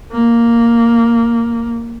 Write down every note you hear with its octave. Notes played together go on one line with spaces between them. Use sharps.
A#3